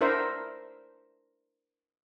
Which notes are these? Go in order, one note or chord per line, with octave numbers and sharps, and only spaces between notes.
D4 E4 A#4 C5 E5